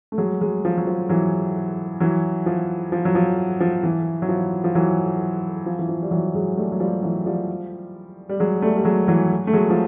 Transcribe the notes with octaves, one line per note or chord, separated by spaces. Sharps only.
A3
F#3 G#3
F#3 G#3
F3
F#3
F3
E3 F#3
E3 F#3
F3
F3
F#3
F3
F3
E3
F#3
F3
F3
E3 F#3
F3
E3
F3
G3
E3 F#3
F#3 G#3
G3 A3
F#3
F3 G3
E3 F#3
F3 G3
G3
F#3 G#3
G3 A3
G3
F#3 G#3
E3 F#3
A3
F#3 G#3
F3